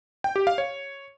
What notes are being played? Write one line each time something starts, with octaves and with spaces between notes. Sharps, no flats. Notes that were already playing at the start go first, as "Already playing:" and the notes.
G5
G4
F5
C#5